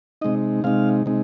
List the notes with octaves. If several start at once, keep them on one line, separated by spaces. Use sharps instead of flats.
C3 G#3 D#4 D#5
C3 G#3 D#4 F5
C3 G#3 D#4